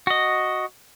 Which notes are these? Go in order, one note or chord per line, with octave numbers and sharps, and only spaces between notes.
F#4 D#5